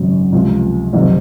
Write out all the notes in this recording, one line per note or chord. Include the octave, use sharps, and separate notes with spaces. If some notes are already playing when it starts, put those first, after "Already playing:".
Already playing: G#1 F#2 C#3 F#3
C#2 C3 F3
F#1 F2 C3 D#3